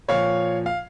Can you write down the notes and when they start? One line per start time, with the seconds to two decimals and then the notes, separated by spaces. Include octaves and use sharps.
0.08 A#2 F3 C#5 F5
0.66 F5